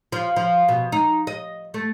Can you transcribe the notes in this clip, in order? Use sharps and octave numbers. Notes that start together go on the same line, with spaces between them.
F3
F3
B2
D#4
D#5
A3